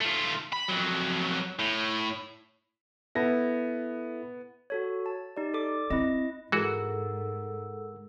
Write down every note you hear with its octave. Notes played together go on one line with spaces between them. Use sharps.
A3 F4
B5
F2 F#3
A2
B3 E4 A4 A#6
F#4 A4 C#5
A5
D#4 G4 D5
A4 D5 D6
C4 E4 D#5
G#2 E3 G#3 F#4 A4 A#4 F#5 E6